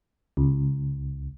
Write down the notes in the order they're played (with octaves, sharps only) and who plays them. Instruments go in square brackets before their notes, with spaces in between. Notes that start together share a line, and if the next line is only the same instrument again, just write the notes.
[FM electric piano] C#2